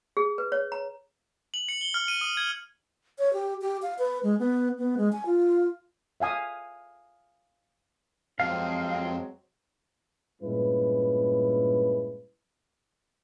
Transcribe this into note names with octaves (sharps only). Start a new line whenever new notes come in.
G#4
B4
C#5
A#5
F#7
C#7
G7
F6
D#7
D#6
G#6
C#5
G4
G4
F5
B4
G#3
B3
B3
G#3
G#5
F4
E5 F5 G#5 D#6
F2 F#3 G#3 C4 F5
G2 A#2 G#3 C#4 E4 B4